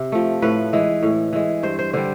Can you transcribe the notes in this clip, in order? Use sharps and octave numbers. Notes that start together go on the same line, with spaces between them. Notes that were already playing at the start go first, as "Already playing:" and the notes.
Already playing: C3
F3 A3
A2 B4
E3 G#3
A2
E3 G#3
G2 C5
C5
D3 G3 C5